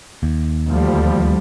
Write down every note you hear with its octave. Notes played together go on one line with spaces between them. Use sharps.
D#2
D2 F3 G3